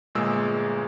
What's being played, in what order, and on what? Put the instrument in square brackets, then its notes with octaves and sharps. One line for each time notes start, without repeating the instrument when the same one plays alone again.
[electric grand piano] G1 A#2 G#3 G#4 E6